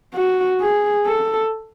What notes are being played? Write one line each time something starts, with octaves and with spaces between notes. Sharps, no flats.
F#4
G#4
A4